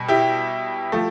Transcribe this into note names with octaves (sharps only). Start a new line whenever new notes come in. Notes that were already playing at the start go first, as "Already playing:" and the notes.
Already playing: B2 G3
E4 G4
F3 A3